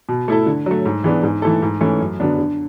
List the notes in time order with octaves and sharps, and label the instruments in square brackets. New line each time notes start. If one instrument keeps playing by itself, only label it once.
[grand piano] B2
A3 E4 A4
D3
F#3 A3
G#2
E3 G#3 B3 D4
G#2
E3 A3 E4 A4
G#2
E3 A3 C#4
F#2
D3 F#3 B3 D4
D3